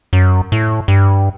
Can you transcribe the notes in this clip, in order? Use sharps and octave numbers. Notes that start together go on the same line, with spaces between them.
F#2
A2
G2